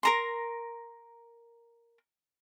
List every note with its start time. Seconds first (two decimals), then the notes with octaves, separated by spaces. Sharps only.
0.03 A#4 A#5 C6